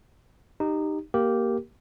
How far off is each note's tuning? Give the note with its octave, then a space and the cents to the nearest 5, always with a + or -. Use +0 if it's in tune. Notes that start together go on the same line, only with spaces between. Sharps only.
D#4 -15 G4 +0
A#3 +0 G4 -10 A#4 +0